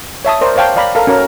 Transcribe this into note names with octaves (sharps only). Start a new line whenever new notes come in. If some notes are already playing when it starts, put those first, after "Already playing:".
C#5 E5 A5 D#6
A#4 C5 D5
C5 C#5 F5 G5 A5
D5 F5 A#5 B5
A4 A#4 F5
C#4 F#4 A#4